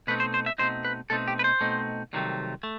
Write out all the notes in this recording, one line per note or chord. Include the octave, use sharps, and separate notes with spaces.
B2 A3 C4 D#4 B4
C5
C5
E5
B2 A3 C4 D#4 C5
B4
B2 A3 C4 D#4 A4
G4
B4
C5
B2 A3 C4 D#4
C2 C3 D#3 F#3 A3
A3